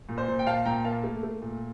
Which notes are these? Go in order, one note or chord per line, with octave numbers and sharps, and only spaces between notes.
A#2
C5
A#2
G5
A#2 F5 A5
A#2 G5 A#5
A#3 F5 A5
A3
A3
A#2